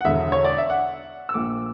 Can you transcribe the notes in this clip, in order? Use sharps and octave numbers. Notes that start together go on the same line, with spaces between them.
F#5
E1 E2 D3 E5
C#5
D5
E5
F#5
E6
A#1 A#2 D6